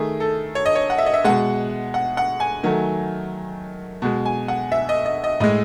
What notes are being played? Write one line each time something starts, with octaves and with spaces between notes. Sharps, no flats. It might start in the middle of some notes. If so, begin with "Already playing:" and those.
Already playing: D#3 A3 G#4
A4
C#5
D#5
C#5
F#5
E5
D#5
E5
B2 G#3 F#5
F#5
F#5
G#5
D#3 F#3 A3
B2 G#3
G#5
F#5
E5
D#5
D#5
D#5
A2 G#3 D#5